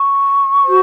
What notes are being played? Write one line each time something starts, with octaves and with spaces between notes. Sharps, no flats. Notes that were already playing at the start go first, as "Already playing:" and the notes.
Already playing: C#6
F#4 C5